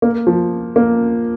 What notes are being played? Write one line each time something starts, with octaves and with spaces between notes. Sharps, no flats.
A#3
F3
A#3